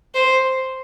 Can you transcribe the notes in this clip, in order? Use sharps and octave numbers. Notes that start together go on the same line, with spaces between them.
C5